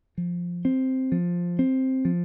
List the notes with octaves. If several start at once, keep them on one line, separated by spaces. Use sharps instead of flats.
F3
C4
F3
C4
F3